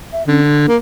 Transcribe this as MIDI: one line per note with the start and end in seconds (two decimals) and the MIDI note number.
0.12 0.23 76
0.27 0.64 50
0.27 0.40 61
0.43 0.68 62
0.68 0.77 58